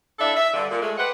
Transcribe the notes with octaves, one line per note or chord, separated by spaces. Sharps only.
C#3 D4 E4 A4 E5
E5
G2 D3
A#2
G#3 A3
G4 B4 C5 F#5